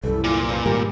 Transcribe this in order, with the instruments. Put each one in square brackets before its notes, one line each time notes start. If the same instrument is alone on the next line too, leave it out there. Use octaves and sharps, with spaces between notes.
[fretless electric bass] C2 F#2 [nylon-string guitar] E3 G3 [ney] A4
[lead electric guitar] A#2 [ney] F4
[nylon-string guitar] F2 F3 B4
[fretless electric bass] G#2 D#3 G3 [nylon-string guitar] G4 A#4